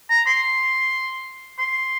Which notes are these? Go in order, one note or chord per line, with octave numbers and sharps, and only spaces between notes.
A#5
C6
C6